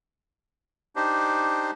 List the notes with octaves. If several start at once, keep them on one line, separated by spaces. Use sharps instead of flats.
D4 D#4 G4 C5